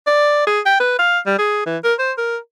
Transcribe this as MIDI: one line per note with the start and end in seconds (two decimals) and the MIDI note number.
0.07 0.47 74
0.47 0.60 68
0.66 0.75 79
0.80 0.98 71
0.99 1.19 77
1.26 1.39 55
1.39 1.63 68
1.66 1.77 52
1.84 1.94 70
1.99 2.12 72
2.18 2.38 70